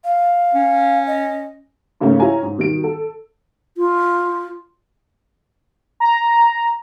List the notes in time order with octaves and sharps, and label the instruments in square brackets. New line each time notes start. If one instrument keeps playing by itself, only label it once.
[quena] F5
[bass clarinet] C#4
[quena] D#5
[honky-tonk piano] G#2 C#3 A3 A#3 C#4
E4 F4 G4 C#5 G#5 A#5
G#2
B2 D#3 G3 D7
A4
[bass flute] F4
[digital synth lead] A#5